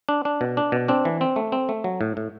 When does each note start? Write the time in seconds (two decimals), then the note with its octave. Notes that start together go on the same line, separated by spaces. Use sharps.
0.09 D4
0.25 D4
0.41 B2
0.57 D4
0.72 B2
0.88 C4 D4
1.05 E3
1.21 C4
1.36 A3
1.52 C4
1.69 A3
1.84 F#3
2.01 A2
2.17 A2